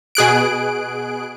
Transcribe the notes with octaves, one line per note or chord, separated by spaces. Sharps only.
B2 G#4 F#6 D7